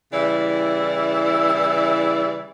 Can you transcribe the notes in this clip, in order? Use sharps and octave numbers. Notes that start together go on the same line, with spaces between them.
C#3 E3 G3 E4 D5